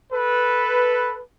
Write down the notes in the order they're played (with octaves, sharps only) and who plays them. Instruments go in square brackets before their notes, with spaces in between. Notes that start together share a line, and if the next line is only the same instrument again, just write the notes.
[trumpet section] A4 B4